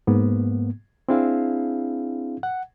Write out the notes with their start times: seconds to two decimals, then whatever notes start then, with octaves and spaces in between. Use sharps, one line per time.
0.07 G#2 A#3 B3
1.09 C4 D4 E4 G#4 F5
2.43 F#5